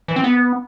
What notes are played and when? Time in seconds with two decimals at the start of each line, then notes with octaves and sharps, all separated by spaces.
0.08 E3
0.16 C4
0.24 B3